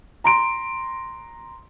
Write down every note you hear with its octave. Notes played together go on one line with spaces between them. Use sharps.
A#5 C6 D7